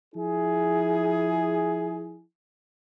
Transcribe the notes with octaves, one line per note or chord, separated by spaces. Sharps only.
F3 E4 G#4